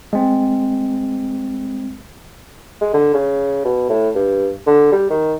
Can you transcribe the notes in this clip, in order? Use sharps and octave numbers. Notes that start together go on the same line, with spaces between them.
G#3 C4
G#3
D3
C#3
B2
A2
G2
D3
G3
D#3